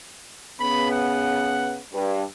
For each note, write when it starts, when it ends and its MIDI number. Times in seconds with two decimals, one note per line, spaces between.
0.60 1.78 49
0.60 1.78 59
0.60 0.87 83
0.91 1.79 78
1.92 2.22 43